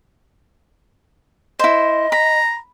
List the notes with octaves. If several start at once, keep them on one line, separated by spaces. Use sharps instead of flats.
E4 C5 D#5
A#5 B5